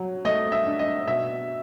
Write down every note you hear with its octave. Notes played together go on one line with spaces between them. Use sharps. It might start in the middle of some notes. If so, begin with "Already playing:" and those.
Already playing: F#3
A3 D#5
E5
D4
D#5
B2 E5